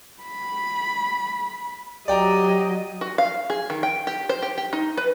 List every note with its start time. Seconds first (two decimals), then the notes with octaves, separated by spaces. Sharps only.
0.23 B5
2.08 F#3 G4 D5 D#5 G5 A#5
3.01 F#4
3.18 F5
3.50 G#4
3.70 D#3
3.83 G5
4.07 G4
4.29 C5
4.42 G4
4.58 G4
4.73 D#4
4.97 B4